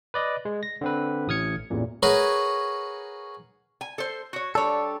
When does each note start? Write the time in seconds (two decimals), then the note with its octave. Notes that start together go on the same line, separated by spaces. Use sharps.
0.14 B4 D5 D#5
0.45 G#3
0.63 A#6
0.81 D3 C4 B4
1.27 A1 A2 D#6 F6 G#6 C#7
1.70 A1 E2 A#2
2.03 F#4 G#4 A#4 B4 C#5 F#5
3.81 G#5
3.98 A4 C5
4.33 F#4 C#5
4.55 G3 D4 A4 C#5